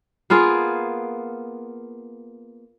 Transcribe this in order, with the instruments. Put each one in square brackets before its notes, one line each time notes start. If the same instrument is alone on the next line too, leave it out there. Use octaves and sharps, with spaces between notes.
[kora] A#3 B3 F4 G#4